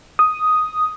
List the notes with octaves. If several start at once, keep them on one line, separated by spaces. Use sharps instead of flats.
D#6